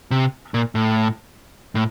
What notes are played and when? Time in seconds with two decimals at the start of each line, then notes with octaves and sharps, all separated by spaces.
0.11 C3
0.54 A#2
0.75 A2
1.75 A2